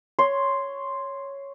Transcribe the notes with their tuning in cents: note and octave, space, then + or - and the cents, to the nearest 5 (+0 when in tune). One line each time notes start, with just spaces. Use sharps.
C#5 +0 C6 +0